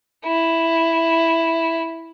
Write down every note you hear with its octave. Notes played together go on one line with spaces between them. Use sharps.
E4